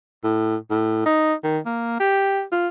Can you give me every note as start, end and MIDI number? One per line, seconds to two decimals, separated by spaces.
0.24 0.56 45
0.70 1.01 45
1.06 1.34 63
1.44 1.58 51
1.66 1.95 58
2.00 2.42 67
2.52 2.68 65